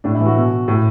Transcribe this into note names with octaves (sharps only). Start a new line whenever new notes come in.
A2 D4
E4
E3
F#4
B2
A2